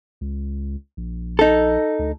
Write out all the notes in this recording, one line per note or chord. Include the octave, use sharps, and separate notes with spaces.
C#2
A#1
D#4 A4
D2